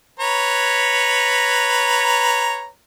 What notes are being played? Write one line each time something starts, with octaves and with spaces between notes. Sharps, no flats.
B4 C#5 A#5